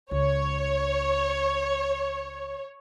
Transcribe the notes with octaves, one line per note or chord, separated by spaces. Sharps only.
C#2 C#5